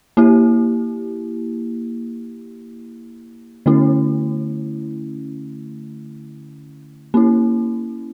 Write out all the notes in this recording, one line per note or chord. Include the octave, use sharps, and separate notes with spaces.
A#3 E4 G4
D3 A3 C#4 E4
A#3 C#4 E4